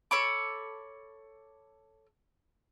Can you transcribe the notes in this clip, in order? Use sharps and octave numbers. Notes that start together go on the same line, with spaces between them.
A4 C#5 B5 D6